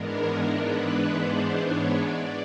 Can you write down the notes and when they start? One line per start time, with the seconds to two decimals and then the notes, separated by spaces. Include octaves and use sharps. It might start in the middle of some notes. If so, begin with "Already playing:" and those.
Already playing: G#2 E3 G#3 B3 D4 A#4
0.53 B4
1.21 C5
1.55 C#5
1.90 D5